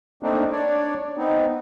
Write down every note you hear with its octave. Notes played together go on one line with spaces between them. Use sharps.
A3 A#3 C4 D4 D#4
D4 C#5 D5
B3 C4 D#4